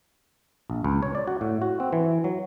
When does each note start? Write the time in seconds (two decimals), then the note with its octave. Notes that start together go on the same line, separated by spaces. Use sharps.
0.70 A#1
0.84 C#2
1.03 C#5
1.15 D5
1.27 F#4
1.41 A2
1.62 F#4
1.80 C4
1.93 E3
2.24 F#3